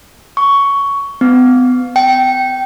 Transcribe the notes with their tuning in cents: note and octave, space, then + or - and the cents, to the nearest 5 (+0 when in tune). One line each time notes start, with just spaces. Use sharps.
C#6 +10
B3 +35
G5 -15